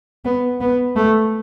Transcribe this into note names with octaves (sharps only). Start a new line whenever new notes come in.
B3
B3
A3